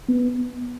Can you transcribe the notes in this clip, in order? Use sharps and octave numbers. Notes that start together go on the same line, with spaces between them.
B3